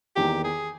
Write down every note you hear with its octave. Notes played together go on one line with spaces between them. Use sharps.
E2 D#3 A#3 G4
G#4